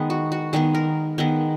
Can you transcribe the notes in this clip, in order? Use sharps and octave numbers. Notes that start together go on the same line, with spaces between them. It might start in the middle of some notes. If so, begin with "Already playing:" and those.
Already playing: D#3 G#3 B3
F#4
F#4
D#3 G#3 B3 G#4
A#4
D#3 G#3 B3